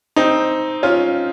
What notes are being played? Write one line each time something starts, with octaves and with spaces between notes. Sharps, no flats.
C4 D#4
C#4 F4